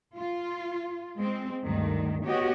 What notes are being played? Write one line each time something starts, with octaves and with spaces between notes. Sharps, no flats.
F4
G#3 C4
D2 G2 D#3
B3 F#4 G4 C#5 D#5